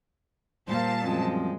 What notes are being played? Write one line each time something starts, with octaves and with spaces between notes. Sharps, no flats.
A#2 G3 C5 F5 A5
F#2 F3 G#3 C4